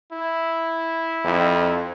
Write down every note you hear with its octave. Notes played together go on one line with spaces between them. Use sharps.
E4
F2